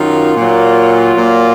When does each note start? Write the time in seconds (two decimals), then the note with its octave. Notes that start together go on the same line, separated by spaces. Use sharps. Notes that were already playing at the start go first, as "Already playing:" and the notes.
Already playing: F#2 D#3 F#3 F4
0.36 A#2
0.41 F#3
1.17 A#2 F#3